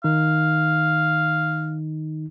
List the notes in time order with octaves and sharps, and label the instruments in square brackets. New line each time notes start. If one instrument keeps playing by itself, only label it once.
[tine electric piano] D#3 D#4 [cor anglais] F5